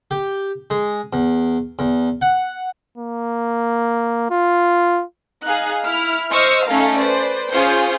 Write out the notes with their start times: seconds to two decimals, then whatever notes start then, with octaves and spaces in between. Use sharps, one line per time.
0.11 G4
0.70 G#3
1.13 E2
1.79 E2
2.22 F#5
2.98 A#3
4.31 F4
5.44 D#4 G#4 F5 F#6
5.85 E4 F6
6.30 C5 D#5 C#6 E6 F6
6.65 A3 C#4 D#4 A4 F5
6.96 B4 C5 D5
7.52 C#4 F4 G#4 C5 G6